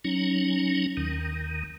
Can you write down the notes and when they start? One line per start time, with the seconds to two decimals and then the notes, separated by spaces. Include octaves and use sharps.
0.05 F#3 C#4 D#4
0.97 D#2 D#3